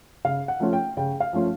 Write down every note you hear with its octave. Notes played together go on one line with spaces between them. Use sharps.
C#3 F5
F#5
F3 A3 C#4 F4
G5
C#3 G5
F5
F3 A3 C#4 F4